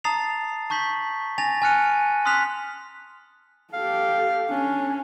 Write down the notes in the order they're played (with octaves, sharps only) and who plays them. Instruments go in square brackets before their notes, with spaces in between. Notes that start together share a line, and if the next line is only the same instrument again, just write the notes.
[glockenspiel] A5 A#5 D#6 A6 C7 F7
A5 C#6 G6 B6 F#7
G#5 A6 A#6 F7
G#5 A5 F6 F#6 C#7 D#7
C6 D#6 F6 F#6 B6 F7
[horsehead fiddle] G4 A4 [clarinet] F5
[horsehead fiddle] C#4 [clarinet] D4